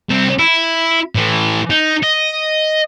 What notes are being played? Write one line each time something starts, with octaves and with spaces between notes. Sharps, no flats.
C2 C4
E4
A2 E3
D#4
D#5